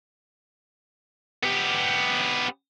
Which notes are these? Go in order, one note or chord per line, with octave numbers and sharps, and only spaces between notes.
B3 G4